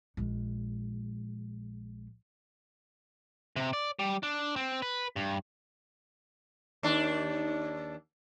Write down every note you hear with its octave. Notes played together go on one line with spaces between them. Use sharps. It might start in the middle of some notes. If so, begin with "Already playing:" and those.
A#1 G#3
C3
D5
G3
D4
C4
B4
G2
D#2 D4